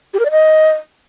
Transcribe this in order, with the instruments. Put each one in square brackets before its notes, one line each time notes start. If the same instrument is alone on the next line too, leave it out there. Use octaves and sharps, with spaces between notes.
[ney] G4
A#4
D5
D#5